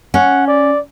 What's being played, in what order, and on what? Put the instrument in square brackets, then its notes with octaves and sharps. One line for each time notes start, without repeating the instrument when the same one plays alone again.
[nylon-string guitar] C#4 [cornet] F#5
[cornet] D5